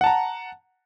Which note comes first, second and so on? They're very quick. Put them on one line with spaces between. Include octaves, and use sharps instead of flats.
F#5 A5 A#5